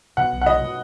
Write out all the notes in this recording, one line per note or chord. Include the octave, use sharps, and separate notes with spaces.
B2 F#5
B1
F#5
B2 D#5
B2